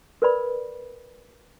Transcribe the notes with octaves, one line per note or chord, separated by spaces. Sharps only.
A#4 B4 D5 B5